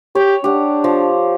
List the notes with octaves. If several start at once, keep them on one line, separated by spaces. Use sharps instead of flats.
G4 C#5
D4 G4 F#5
F3